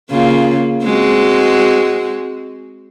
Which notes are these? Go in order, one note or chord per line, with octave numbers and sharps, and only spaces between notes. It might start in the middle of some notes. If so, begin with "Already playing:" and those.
C#3 A#3 F4
G#3 C4 F#4